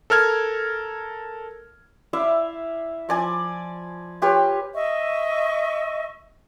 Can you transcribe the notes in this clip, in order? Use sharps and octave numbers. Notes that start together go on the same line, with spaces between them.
A4 A#4 F6 G#6
E4 D5 E5 F5
F3 D5 G#5
F4 G4 B4 C#5
D#5 E5 C#6